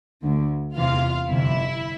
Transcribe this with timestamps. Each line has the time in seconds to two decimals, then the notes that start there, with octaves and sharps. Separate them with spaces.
0.22 D2 D3
0.76 E2 C3 E3 F4 F5
1.30 G1 F2 C3 E4 E5